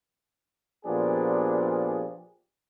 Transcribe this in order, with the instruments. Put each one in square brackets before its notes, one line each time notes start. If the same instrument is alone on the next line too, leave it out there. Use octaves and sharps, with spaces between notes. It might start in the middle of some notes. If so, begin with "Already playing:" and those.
[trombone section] A#2 F3 B3 D4 G4 G#4